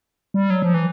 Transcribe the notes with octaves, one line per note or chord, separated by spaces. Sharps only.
G3
F#3
F3
E3